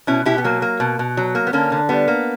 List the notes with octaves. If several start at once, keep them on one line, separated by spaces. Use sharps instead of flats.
B2 C#4 E4
B2 E4 G4
B3
F#3 A#3
A#3
B2
B2
F#3
A#3
B3
D3 A#3 C#4
D3
G3 B3
A#3